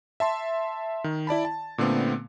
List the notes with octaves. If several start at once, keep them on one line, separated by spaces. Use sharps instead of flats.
E5 A5 C6
D#3
E4 D5 A5 B5
A5
A#2 D3 A3 B3 C4